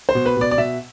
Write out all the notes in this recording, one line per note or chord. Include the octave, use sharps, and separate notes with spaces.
C5
B2
B4
B2 D5
D5
B2 E5